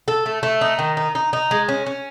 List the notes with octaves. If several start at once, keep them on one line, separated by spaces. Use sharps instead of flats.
A4
A3
A3
D#4
D#3
D#4
D#4
D#4
G#3
C#4
C#4